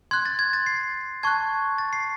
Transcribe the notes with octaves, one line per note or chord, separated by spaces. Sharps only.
C6 F#6 G#6
A6
G#6
A6
C7
A5 C#6 F#6 G#6
A6
C7